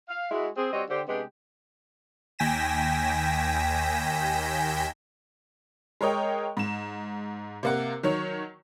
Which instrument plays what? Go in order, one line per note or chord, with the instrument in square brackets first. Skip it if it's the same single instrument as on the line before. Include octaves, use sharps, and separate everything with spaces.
[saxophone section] F5
G#3 E4 F#4
C4 G#4
G3 C4 F#4 C5 C#5 D#5
D3 G4 C5
C3 G#3 B3 D4 G4
[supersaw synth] D#2 G5 G#5 A#6 B6 E7
[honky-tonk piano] G#3 A#4 C#5 D#5 G5
G#2 E7
C3 A#3 F#5
D#3 F#3 C#5